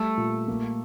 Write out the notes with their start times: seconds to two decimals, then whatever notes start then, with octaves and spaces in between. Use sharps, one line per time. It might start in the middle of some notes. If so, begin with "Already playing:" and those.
Already playing: G3 A3
0.17 A#2
0.48 A#3